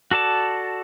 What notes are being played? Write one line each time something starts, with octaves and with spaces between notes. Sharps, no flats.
F#4 A4 D5 A5